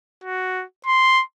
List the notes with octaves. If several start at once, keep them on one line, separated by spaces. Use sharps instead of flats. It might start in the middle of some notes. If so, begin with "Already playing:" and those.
F#4
C6